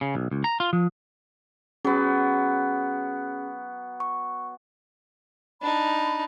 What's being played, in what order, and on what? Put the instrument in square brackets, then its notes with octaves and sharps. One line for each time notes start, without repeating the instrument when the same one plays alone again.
[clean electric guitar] C#3
B1
C#2
A#5
F4
F3
[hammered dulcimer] F#3 B3 [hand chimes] C#4 G#4
[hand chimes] C#6
[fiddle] D4 D#4 [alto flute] B5